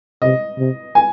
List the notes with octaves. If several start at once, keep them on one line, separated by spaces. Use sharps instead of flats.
C3 D#5
C3
G#5